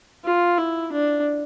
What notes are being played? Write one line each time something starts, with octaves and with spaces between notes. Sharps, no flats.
F4
E4
D4